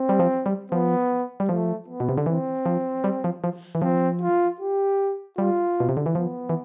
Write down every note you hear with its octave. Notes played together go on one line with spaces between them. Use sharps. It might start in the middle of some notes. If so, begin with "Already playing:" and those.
Already playing: C4
G3
F3
G3
F3 B3
G3
F3 A3
B3
B2
C3
D3
E3 C4
F3
G3
F3
F3
E3
F3 C4
F4
G4
G3 F4
B2
C3
D3
E3
F3 B3
E3